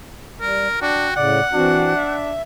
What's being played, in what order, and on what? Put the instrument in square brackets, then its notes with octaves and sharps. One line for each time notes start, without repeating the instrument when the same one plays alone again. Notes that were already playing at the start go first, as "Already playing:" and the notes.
[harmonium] G3 [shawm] A#4
[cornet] D4 [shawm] F#4 [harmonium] G5
[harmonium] A2 C#3 [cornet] D5 [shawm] F#5
[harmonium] E3 C4 F#4 [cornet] D4
[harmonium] E5